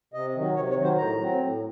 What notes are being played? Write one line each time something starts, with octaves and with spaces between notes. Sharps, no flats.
C3 D#5
D#3 F#3
C3 C#5
C#5
D#3 F#3
C5
A2 A#5
F#3
C4
A2